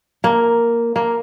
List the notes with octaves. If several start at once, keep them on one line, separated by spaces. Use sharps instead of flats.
A#3
A#3